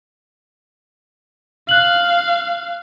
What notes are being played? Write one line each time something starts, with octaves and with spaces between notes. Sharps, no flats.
F5 F#6 F#7